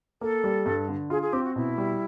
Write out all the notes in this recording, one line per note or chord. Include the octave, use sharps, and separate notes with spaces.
A#3 A4
G3
G2
D3
F4 G#4
G#4
C4 G4
F#4
B2 E4
G3